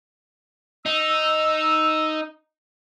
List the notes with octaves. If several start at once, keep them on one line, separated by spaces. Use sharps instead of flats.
D#4 E6